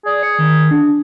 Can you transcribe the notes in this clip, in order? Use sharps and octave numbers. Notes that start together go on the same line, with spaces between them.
G#4 D5
C#7
D#3
D4